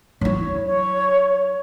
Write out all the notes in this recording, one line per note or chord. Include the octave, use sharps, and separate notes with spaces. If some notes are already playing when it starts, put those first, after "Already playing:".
F#3 E4 C#5
C#5